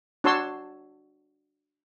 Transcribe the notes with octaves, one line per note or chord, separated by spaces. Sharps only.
D4 F#4 C#5 A5 C6 E6